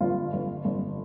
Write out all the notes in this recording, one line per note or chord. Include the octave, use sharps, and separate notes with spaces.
G1 F4
G1
G1